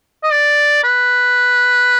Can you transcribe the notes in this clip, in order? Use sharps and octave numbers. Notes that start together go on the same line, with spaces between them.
D#5
D5
B4